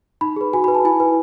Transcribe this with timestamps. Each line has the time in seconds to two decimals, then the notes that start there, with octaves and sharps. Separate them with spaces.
0.21 D#4 B5
0.36 G#4 B4
0.53 F#4 G#5
0.64 B5
0.68 B4
0.75 A5
0.85 E4 G#5
1.00 B4